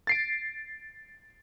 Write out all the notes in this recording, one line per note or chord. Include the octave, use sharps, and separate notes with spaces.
A6 C7 D7